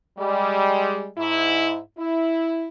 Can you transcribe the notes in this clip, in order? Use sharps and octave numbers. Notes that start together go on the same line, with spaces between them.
G3 G#3
G#2 E4
E4